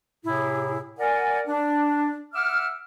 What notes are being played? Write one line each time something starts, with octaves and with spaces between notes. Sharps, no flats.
A2 C3 E4 G#4
A#4 D5 F#5 G#5
D4
E5 F#5 D6 E6 F6